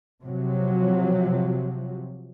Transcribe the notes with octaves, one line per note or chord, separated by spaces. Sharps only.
C3 F3 F#3